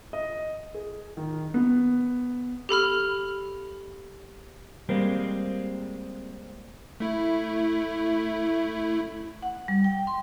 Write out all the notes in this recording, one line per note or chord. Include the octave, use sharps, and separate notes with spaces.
D#5
G#4
D#3
B3
G4 A4 B5 F6
G3 G#3 A#3 C4
A3 E4
F#5
G3
G5
C6